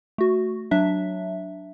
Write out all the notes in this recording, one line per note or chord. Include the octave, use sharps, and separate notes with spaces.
A3 F#4
F#3 D4 E5